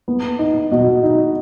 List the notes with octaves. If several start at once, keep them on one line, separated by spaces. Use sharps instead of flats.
B3
D#4
B2
D#4